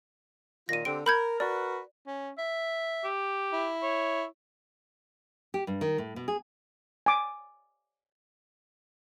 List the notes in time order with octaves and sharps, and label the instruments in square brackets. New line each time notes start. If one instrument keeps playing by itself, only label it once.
[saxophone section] A#2 D#3 F4 [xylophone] A#6 D#7
[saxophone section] D3 C4 G4 [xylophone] D7
[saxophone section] A#4 [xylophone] B5 G6 G#6
[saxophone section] F#4 A#4 B4 [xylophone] D5
[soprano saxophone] C#4
E5
[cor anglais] G4
[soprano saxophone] E4
[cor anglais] C#5
[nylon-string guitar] G4
G2
D#3
A2
B2
G#4
[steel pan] G#5 D6